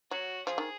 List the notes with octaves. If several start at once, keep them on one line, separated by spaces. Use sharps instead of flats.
F#3 F#4
F3 G#4
D#3